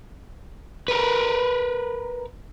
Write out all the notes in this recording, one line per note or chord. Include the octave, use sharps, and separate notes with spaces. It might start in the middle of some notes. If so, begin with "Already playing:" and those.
A#4 B4